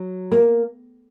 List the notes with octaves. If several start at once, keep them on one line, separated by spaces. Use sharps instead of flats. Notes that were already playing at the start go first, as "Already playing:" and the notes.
Already playing: F#3
A#3